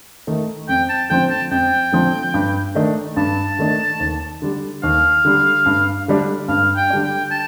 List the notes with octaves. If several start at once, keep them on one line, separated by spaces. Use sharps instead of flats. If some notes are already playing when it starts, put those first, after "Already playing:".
D#3 A3
F2 G5
A5
D3 F3 C4 G5
A5
F2 G5
D3 F3 C4
G2
D#3 A3 D4
G2 A5
D#3 A3 D4
D#2
D3 G3
D#2 F5
D3 G3
G2
D3 G3 D4
G2 F5
G5
D3 G3 D4
G5
A5